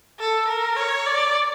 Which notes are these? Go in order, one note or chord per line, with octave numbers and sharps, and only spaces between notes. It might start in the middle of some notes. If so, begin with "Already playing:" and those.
A4
A#4
C#5
D5